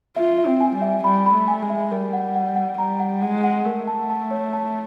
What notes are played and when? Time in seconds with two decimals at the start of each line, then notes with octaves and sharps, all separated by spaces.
0.16 F4 E5
0.38 E5
0.46 C4
0.61 G#5
0.76 G3
0.82 E5
1.04 G3 B5
1.26 B5
1.34 A3
1.48 G#5
1.62 G#3
1.70 E5
1.91 G3 A#4
2.13 F#5
2.35 F#5
2.56 F#5
2.78 G3 A#5
3.00 F#5
3.22 G#3 F#5
3.44 F#5
3.65 A3 A#4
3.87 A5
4.10 A5
4.31 C#5
4.53 A5